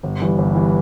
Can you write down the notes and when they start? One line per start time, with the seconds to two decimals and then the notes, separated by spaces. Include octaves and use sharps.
0.03 G1
0.21 G2 E3
0.38 G1
0.55 G2 E3